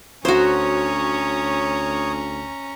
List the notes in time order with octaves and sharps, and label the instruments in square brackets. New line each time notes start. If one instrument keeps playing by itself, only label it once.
[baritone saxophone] D2 [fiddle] C#4 A#5 [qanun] F#4 C5 [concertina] C#5 D#6